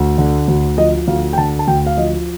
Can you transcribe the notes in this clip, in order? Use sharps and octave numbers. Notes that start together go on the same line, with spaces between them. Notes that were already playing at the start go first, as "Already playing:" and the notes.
Already playing: D2
D3
D2
F3 D#5
D2 F5
G5
D3 A5
A5
D2 G5
F5
F3 D#5